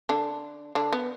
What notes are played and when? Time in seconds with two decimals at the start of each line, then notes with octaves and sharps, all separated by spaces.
0.09 D3 D4
0.75 D3 D4
0.92 B3